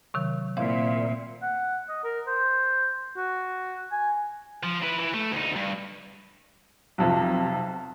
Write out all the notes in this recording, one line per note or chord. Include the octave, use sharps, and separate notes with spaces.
C3 D#3 F#3
A#2 C4 E4 F5
F#5
D#5
A#4
C5
F#4
G#5
F3
E4 B4
E3
A3
D2 D#4
G2
B1 F2 C3